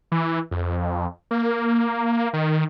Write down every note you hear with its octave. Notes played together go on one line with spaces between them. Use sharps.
E3
F2
A#3
D#3